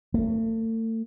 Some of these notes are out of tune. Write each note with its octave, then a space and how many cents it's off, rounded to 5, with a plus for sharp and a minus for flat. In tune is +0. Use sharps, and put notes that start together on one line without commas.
A3 +40